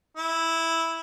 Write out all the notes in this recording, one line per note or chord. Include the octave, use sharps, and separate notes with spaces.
E4